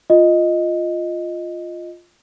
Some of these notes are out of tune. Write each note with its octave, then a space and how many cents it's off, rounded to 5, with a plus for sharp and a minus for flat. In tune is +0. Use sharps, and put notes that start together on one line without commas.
F4 +0 D#5 +0